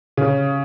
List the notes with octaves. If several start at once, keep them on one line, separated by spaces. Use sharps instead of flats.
C#3